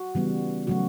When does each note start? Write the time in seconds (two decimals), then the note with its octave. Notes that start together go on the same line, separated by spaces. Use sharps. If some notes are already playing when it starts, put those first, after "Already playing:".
Already playing: F#4
0.15 C#3 E3 G3 B3
0.67 C#3 F#3 A3 F#4